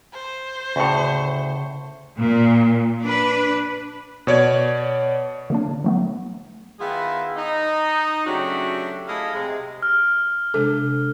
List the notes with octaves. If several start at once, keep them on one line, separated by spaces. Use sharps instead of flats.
C5
D2 A2 C#3 C#6 C#7
A#2
D4 B4
B2 C#5 D5 G#6
D3 A#3 D4
F#3 A3 B3
D#3 B3 E4 F4 G#4
D#4
C#3 F#3 A3 D4 F#4 G4
A3 E4 G#4 D#5 F5
C3 G#3
F6
C3 G#3 D4 A4